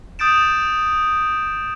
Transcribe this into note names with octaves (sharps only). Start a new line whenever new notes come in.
D#6 G6 A6 D7 E7